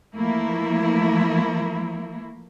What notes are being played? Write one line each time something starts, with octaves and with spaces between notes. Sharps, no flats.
E3 F3 A3 A#3 E4